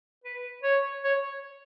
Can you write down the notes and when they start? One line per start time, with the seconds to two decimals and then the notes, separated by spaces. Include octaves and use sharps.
0.24 B4
0.63 C#5
1.04 C#5